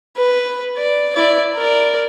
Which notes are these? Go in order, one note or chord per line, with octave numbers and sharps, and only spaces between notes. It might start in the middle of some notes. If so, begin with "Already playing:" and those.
B4
D5
E4 D5
A#4 D5